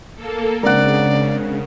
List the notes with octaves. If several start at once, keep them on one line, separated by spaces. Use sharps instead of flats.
A#3 A4
C#3 G#3 C4 D4 A#4 D5 F#5